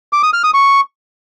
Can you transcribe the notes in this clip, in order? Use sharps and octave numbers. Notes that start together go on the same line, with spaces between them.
D6
D#6
F6
D#6
C#6